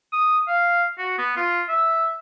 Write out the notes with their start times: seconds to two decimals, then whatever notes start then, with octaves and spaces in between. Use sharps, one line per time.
0.13 D#6
0.48 F5
0.98 F#4
1.18 B3
1.36 F4
1.69 E5